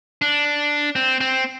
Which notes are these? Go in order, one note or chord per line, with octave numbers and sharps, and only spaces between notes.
D4
C4
C4